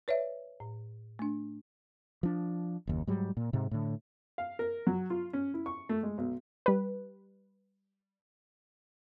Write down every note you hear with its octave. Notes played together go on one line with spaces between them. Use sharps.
B4 C#5 D5 E5
A2
A3 D4
F3 D4
F#1 D#2
G#2 F#3 G3
A#2
G#2 C3
A2 D3
F5
A#4
F#3
F4
C#4
E4
C#6
A3
G#3
B1
G3 B4